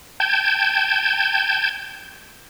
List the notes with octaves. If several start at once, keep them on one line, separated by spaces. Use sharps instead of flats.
G5 A5 G6 G#6